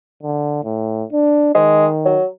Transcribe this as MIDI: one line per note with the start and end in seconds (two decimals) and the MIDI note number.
0.23 0.63 50
0.64 1.03 45
1.12 1.50 62
1.55 2.18 51
1.55 1.86 56
2.05 2.25 54